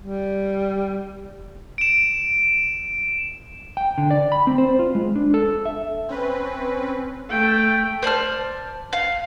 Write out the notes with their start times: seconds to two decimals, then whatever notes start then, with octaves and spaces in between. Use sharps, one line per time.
0.01 G3
1.78 D7 E7
3.77 G5
3.98 D3
4.11 D5
4.32 B5
4.47 C4
4.58 C5
4.79 F4
4.95 G#3
5.16 D4
5.34 A4
5.66 E5
6.09 C4 C#4 B4
7.29 A3 G5
8.03 C5 D5 A5 F6
8.93 F5